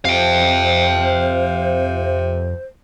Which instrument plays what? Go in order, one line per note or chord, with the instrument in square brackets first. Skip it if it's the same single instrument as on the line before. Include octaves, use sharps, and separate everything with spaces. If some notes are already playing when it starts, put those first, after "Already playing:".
[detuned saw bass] F2 [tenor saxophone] C3 [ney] C5 [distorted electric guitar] F5 G5